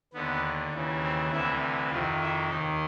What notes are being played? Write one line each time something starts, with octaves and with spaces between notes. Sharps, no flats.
D#2 D3 B3
D#2 C#3 E3
C4
D2 C3 E3 E4
F2 C3 D#3 F4
E4
D#2 D#3 D#4